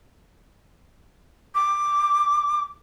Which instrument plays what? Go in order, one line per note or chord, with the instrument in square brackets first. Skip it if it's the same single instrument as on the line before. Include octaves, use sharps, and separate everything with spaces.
[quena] D6